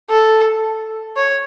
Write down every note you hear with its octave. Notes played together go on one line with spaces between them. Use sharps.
A4
C#5